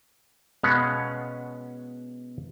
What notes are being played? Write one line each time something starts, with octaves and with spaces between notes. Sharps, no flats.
B2 G#3 B3 C#4 F5 F#5